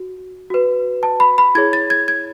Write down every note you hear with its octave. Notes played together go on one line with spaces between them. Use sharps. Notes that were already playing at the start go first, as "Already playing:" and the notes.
Already playing: F#4
F#4 B4
A5
B5
B5
E4 G#4 C#5 G#6
A6
G#6
G#6